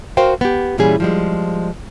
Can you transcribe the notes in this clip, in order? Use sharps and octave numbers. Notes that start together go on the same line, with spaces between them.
F#4 A#4 C5 F5 G5
B3 G4
A#2 E3 G3 C#4 G#4
F3 G3 G#3